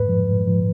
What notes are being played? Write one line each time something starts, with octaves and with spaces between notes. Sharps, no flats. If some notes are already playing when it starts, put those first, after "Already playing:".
Already playing: F2 G#2 B4
F3
G#2
F3